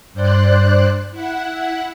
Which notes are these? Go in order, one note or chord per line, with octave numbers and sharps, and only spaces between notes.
G2 C5 D5 F#6
E4 F#5